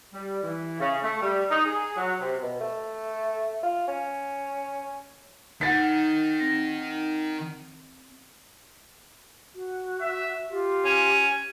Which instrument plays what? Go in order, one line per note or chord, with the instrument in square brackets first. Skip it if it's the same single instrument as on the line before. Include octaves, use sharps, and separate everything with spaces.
[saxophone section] G3
E3
C#3
A3
G3
D#4
G#4
F#3
C3
[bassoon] B2
A3
F4
C#4
[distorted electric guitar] D#3 [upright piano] F#5 A6 B6
[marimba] C4 A#6
[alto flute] F#4
[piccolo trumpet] E5
[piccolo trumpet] F4 [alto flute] G4
[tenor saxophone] C#4